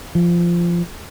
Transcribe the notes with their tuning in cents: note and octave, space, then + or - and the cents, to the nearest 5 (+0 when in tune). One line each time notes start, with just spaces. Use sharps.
F3 -15